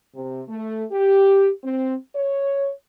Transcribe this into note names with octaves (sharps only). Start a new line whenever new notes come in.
C3
A3
G4
C4
C#5